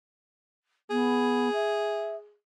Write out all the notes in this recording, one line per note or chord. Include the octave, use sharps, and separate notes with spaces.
B3 G#4
E5